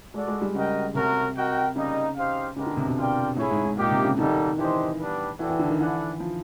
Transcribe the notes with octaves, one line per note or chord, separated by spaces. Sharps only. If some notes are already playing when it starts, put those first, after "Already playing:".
G#3 F#4 A4 D5
G#3
G3
C#3 F#4 A#4 D#5 G5
C3 A3 C#4 F#4 A#4
F#4 A#4 D#5 G5
C#3 G3 A#3 D#4
D#4 G4 C5 F5
C#3 G#3 B3 D#4 G4 A#4
D3
C3
B2
F4 A#4 D5 G5
A2 E4 G#4 C#5
G#2
G#2
A#2 A#3 D#4 G4
C3
C#3
D#3 G3 A#3 D#4 F#4 A4
E3 D4 G4 C5 D#5
G3 B3 D4 G4 B4
E3 F#4 A4 D5 G5
E3
D3
D#3
E3 E4 A4 D5 F#5
F3